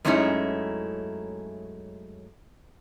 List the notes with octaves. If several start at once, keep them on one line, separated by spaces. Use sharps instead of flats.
F#2 G#3 A3 C#4 D#4 E4